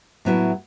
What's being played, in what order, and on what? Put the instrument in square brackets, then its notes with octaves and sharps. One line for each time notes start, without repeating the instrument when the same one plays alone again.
[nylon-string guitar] A2 F#3 B3 E4